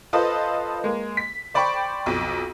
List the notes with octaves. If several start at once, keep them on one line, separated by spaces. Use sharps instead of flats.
F4 A4 B4 C5 D#5
G#3 A#3
B6
C5 D5 G5 B5 C#6
B1 F2